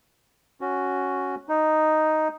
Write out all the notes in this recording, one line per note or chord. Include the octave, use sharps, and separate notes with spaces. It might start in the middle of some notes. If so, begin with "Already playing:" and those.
C#4 F#4
D#4